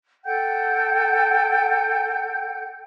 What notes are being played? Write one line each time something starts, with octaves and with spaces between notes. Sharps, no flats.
A4 F#5 G5 G6